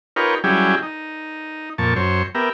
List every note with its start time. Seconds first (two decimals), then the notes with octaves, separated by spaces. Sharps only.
0.16 D#4 F4 G4 A#4 B4 C#5
0.44 F#3 G3 C#4 E4 G4 G#4
0.83 D#4
1.78 F2 A#2 A5 C#6
1.96 F#2 C5 C#5
2.35 B3 G4 A#4 E5